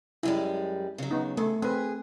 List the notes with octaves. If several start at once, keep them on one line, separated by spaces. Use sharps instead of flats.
F#2 G3 G#3 E4
C#3 F#3
B3 D#4
C#3 A3
C4 G#4 B4